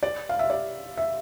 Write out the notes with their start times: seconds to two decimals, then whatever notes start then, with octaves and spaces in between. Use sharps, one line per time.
0.03 D5
0.29 F5
0.39 E5
0.50 D5
0.97 E5